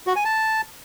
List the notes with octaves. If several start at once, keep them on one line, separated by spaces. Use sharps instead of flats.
F#4
G#5
A5